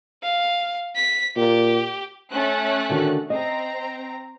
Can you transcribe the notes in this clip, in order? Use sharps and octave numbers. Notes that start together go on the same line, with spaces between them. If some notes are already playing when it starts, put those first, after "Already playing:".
F5
B6
A#2 G4
A3 C#4 F#6
D3 D#3 F#4
C4 D#5 A#5